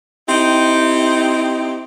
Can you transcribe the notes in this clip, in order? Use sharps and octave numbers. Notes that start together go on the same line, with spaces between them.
C4 D#4 E4 G4